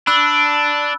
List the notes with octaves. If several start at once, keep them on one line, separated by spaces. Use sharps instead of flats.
D4 B5 E6 F#6